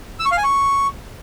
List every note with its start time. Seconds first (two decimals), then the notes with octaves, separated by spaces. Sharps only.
0.20 E6
0.26 C#6
0.32 F5
0.38 G#5
0.44 C#6